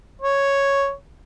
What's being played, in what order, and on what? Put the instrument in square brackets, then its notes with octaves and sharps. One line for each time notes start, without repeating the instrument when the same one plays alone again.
[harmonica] C#5